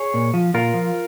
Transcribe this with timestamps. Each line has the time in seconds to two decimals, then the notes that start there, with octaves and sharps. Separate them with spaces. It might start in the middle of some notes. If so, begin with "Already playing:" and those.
Already playing: G#4 C#5
0.14 A#2
0.34 F3
0.54 A#2 F4 A#4
0.74 F3